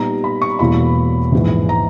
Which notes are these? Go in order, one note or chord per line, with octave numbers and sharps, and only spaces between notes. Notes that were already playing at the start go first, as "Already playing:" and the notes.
Already playing: A#2 G3 B3 D#4 A#5
B5
C#6
E1 E2 B2 A#3 E4 B5
A#1 G#2 E3
A#5